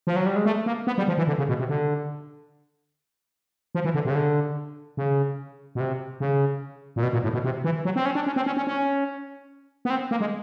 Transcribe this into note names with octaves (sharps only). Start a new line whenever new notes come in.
F3
F#3
G3
G#3
A3
A#3
B3
G3
F3
E3
D3
C#3
B2
C3
D3
F3
E3
D3
C3
C#3
D3
C#3
B2
C3
C#3
A#2
B2
A#2
A2
B2
C3
E3
F#3
C4
C#4
D4
C#4
C4
C#4
C#4
C#4
B3
C4
A#3
G#3